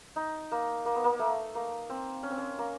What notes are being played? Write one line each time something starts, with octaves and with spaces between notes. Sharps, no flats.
D#4
A#3
A#3
B3
A#3
A3
A#3
C4
C#4
C4
C#4
A#3